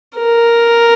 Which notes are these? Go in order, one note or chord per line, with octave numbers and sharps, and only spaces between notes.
A#4